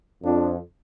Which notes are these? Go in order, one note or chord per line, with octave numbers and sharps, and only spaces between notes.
F2 D4